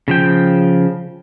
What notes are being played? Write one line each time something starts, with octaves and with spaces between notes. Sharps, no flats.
C#3 F3 G5